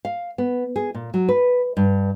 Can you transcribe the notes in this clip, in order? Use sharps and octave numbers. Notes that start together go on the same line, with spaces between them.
F5
B3
G#4
A#2
F#3
B4
G2